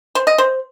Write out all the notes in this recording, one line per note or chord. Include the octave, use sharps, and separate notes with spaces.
C5
D#5
C5